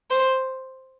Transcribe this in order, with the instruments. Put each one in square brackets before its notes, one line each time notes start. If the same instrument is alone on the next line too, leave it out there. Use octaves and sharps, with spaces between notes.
[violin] C5